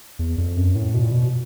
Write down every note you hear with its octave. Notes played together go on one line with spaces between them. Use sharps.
E2
F2
F#2
A2
B2
A#2
B2